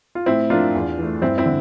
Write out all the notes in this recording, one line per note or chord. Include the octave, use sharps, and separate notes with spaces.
F4
A2 C4 E4
F3 A#3 D4 F4
E2
E3 A3
G2 C4 E4
C4 E4
D3